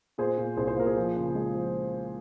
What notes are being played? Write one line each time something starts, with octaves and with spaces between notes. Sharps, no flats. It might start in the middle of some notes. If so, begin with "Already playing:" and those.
A#2 G#4 C5
A#2
C2 G#4 C5
G#4 C5
A#2 A#4
G#4 C5
F3
C#3
G#3
F3